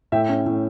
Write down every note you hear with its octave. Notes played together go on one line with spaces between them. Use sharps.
A2 E5 G5
C#4
A2